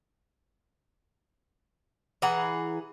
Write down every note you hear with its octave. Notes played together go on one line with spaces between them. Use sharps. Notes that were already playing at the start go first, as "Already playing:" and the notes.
E3 G#4 F#5 A#5